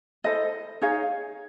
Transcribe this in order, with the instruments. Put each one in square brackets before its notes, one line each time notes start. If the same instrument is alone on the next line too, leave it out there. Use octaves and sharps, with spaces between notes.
[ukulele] E4 A4 C5 D#5
D#4 G#4 C#5 F5